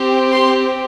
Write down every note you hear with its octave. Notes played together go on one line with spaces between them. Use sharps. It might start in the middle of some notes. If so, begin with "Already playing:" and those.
Already playing: C4 G4
C6